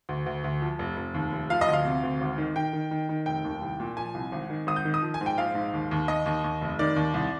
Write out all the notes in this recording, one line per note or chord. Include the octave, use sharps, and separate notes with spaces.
D2
D2
D2
F3
F1
F1
D#2
F1
F3 F5
D#5
D2
F5
C3
D2
G#1
D#3
D#3 G5
D#3
D#3
D#3
F1 G5
D#2
C2
A#2
F3 G#5
C2
G#1
D#3
G#1 D#6
G6
D#3
D#6
F3
G#5
G#2
G5
A#1 F5
G#2
D#2
D#2
D#2 D#5
D#2
D#2
F1
D#3 D5
D#2
C2